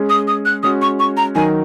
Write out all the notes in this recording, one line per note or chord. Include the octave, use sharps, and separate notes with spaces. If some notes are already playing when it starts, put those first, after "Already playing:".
Already playing: G#3 C#4 G#4
D#6
D#6
F#6
G#3 C#4 F#4 D#6
C#6
C#6
A#5
D#3 F#3 D#4 A#4 G#5